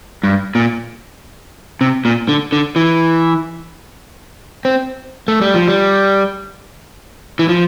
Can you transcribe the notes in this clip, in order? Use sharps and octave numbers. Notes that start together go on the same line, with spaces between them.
G2
A#2
C3
A#2
D3
D3
E3
C4
A3
G3
F3
G3
E3
F3